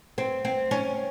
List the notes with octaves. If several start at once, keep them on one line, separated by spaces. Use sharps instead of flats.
C4
C4
C#4